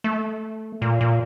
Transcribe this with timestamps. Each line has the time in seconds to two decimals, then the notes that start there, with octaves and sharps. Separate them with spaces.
0.04 A3
0.82 A#2
1.01 A#2